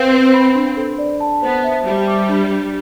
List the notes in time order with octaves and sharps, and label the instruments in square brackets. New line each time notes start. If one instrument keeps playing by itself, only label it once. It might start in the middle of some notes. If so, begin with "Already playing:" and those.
Already playing: [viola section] C4 [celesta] B4 F5
[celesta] B4
B5
D4
A4
D5
A5
[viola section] B3 [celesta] C5
[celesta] E5
[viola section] G3 [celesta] E5
[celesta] D6
D4
D4